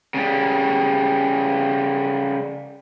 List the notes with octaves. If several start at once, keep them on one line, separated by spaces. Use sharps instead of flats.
C#3 G3